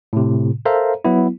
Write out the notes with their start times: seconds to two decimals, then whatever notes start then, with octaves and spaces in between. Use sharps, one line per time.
0.13 A2 C3
0.65 A4 A#4 C5 E5 F5 A#5
1.05 F#3 B3 E4